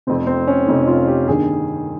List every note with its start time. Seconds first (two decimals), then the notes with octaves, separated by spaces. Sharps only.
0.07 F1 F2 C3 C4
0.27 C4
0.48 C#4
0.67 F1 F2 C3 D#4
0.87 F4
1.07 G4
1.28 G1 G2 D#3 G#4